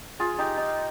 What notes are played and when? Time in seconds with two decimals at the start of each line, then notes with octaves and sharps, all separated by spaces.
0.20 F4 G#4
0.38 D#4 G4
0.57 D#4